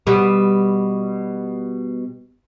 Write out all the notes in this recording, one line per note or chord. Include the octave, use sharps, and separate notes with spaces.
B2 G3